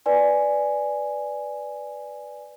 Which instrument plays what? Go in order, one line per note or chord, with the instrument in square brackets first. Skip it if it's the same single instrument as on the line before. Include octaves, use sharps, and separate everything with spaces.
[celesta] B4 D5 G#5